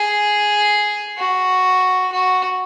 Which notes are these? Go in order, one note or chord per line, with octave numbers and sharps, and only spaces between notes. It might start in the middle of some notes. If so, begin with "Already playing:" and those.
Already playing: G#4
F#4
F#4